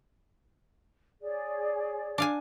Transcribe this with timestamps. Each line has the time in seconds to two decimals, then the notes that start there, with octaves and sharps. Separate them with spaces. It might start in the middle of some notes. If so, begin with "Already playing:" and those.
1.22 G#4 C#5 D5
2.18 D4 F5 G#5